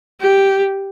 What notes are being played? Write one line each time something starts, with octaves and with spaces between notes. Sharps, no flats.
G4